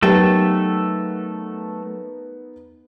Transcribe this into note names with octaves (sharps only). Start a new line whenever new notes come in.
F#3 A3 B3 D#4 G4 A4 A#4 G5